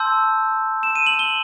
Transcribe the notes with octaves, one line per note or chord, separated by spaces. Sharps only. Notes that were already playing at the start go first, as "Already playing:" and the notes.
Already playing: A5 C6 E6 G6
E7
D#7
F#7
G7